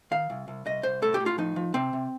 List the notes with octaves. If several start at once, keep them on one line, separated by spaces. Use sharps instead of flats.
D#3 F5
C2
C2
C2 D#5
C2 C5
A2 A4
G4
A2
F4
F3 D#4
F3
C3 C4
C3